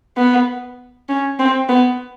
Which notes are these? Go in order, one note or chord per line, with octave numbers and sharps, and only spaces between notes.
B3
C#4
C4
B3